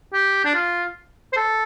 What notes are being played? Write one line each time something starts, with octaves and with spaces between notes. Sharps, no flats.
G4
D4
F4
C5
A4